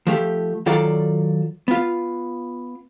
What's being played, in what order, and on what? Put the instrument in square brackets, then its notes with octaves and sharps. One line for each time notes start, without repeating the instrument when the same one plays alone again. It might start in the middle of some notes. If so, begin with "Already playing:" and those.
[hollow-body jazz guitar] F3 A3 G4
D#3 F#3 F4 A4 D5
B3 F4